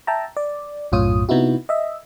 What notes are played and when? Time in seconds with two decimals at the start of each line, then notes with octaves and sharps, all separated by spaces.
0.07 E5 G5 A5 A#5
0.37 D5
0.92 B1 F#2 A2 F4 C#5 D#6
1.29 C3 B3 D#4 E4 F#4
1.69 D#5 E5